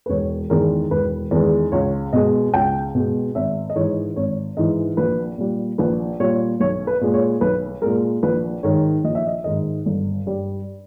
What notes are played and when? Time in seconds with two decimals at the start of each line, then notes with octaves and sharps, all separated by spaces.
0.06 B4
0.09 E1 C#5
0.50 E2 D#3 G#3 A#4
0.91 E1 B4
1.31 E2 D#3 G#3 B4
1.72 C#2 C#5
2.13 B2 G#3 D#5
2.54 C#2 G5
2.95 B2 G#3
3.35 G#1 E5
3.70 D#5
3.75 G#2 E3 C#5
4.16 G#1 C#5
4.57 G#2 E3 D#5
4.97 A#1 B4
5.38 A#2 G3
5.78 A#1 B4
6.20 A#2 G3 C#5
6.60 B1 C#5
6.87 B4
7.01 A#2 G#3
7.14 C#5
7.41 B1 B4
7.82 A#2 G#3 A#4
8.23 A#1 B4
8.63 G#2 D#3 C#5
9.04 A#1 D#5
9.15 E5
9.26 D#5
9.44 G#2 D#3 D#5
9.86 G1
10.26 G2 G3